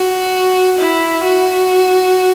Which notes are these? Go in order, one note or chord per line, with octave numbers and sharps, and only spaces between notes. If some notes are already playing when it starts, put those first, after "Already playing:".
Already playing: F#4
E4
F#4